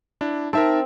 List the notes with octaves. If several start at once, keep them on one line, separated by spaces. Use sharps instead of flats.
D4 E4
C4 D#4 A#4 E5 A5